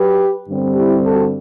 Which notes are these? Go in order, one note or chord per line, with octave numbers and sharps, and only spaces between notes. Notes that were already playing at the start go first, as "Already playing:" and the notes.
Already playing: F#3 G4 B4
G2 D3 G3 C4
E4 G4
F#4 A4